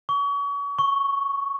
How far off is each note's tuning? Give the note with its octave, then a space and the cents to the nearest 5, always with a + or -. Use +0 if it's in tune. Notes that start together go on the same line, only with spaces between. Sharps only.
C#6 +35
C#6 +0